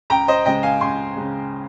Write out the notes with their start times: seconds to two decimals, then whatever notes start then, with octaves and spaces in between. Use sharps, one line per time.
0.10 C#2 G5 A#5
0.28 C5 D#5
0.45 C#3 G#3 D#5 G5
0.63 F5 G#5
0.81 C#2 G#5 C6
1.17 C#3 G#3